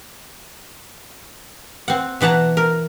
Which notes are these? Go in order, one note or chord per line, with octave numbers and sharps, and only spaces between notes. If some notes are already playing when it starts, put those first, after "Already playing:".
C4 F#5
B2 E3 F#5 A5 A#5
A#4